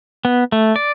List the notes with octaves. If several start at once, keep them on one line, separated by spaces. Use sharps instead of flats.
B3
A3
D5